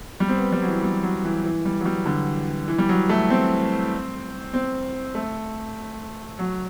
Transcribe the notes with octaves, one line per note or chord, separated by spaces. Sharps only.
G3
C4
B3
G3
F#3
E3
G3
F#3
E3
E3
G3
F#3
G3
D3
E3
G3
F#3
A3
C4
C4
A3
F#3